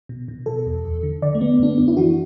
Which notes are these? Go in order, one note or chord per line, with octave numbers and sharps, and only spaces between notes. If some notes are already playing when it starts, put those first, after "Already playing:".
B2
B2
B2 A4
E2
E2
D3
D3 D5
A3
D3 B3
F#2 D4
B3
F#2 D4
E4
E3 F#4